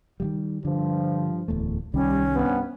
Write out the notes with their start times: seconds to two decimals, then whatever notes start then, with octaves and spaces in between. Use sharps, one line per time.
0.20 D#3 F3 G3
0.65 G2 D3 F3
1.48 D1 E2 A3
1.94 C2 D#3 G3 C#4
2.35 G2 C3 B3